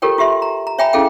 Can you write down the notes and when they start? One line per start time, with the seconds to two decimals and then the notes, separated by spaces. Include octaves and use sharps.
0.02 F4 G4 A4 A#4 C#5 G5
0.18 F4 G4 E5 C6
0.42 A#5
0.67 A#5
0.78 C#5 E5 G5 G#5 A#5 B5
0.93 C#4 E4 G#4 A4 F5 G5